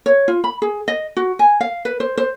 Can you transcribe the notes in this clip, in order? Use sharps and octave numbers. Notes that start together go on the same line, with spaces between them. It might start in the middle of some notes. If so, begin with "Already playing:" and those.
C#5
F4
B5
G#4
D#5
F#4
G#5
F5
B4
C5
C5